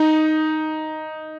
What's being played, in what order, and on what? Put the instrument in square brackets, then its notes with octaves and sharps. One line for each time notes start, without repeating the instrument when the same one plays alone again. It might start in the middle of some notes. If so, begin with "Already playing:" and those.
Already playing: [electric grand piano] D#4